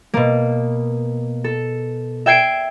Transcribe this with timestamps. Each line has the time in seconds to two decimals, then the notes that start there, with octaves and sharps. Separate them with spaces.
0.14 B2 A#3
1.44 A4
2.26 E5 G5 G#6 C7 D7